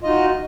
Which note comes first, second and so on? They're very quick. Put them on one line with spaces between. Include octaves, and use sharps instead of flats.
F4 D#5 D#4 F#4